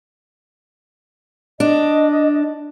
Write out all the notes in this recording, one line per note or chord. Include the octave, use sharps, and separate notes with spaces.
D4 D#5